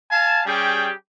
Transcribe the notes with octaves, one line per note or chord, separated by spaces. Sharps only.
F5 G#5 A5
G3 C#4 G4 G#4 G5